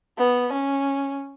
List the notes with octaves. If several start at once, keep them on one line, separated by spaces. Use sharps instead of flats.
B3
C#4